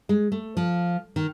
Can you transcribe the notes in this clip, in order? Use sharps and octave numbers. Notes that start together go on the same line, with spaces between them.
G#3
A3
F3
D#3